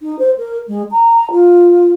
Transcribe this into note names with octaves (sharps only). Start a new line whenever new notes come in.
D#4
C5
A#4
G#3
A#5
F4